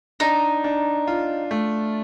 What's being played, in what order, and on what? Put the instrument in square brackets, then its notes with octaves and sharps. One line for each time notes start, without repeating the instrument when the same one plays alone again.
[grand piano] D4 [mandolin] D#4
[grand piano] D4
F4
A3